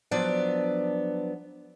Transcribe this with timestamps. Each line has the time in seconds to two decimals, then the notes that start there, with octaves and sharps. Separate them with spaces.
0.11 F3 F#3 B3 D4 D5